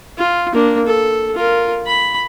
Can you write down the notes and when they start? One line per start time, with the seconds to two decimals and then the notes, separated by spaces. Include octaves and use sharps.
0.18 F4
0.53 A#3 D4
0.86 A4
1.35 F4 A#4
1.86 B5